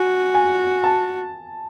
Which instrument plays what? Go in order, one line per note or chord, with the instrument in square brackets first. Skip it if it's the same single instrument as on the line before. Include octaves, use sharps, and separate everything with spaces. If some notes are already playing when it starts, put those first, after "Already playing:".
Already playing: [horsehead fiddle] F#4 [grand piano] G#5
[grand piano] G#5
A5